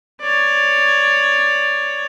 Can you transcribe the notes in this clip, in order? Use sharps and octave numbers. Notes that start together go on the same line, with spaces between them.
C#5 D5